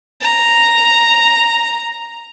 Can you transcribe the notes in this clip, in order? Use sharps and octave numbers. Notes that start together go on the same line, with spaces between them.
A#5